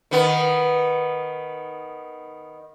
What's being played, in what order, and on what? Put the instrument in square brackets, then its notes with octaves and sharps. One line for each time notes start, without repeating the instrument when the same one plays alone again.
[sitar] D#3 B3